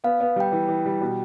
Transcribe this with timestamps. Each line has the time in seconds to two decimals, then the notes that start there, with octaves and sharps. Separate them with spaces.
0.04 B3 F5
0.20 B3
0.36 G3 G5
0.52 E3
0.69 E3
0.85 G3
1.01 B2